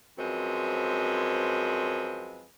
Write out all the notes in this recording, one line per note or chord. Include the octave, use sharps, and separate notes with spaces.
F#2 F3 G#3 C4 B4